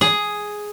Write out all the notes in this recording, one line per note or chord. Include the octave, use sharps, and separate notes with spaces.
G#4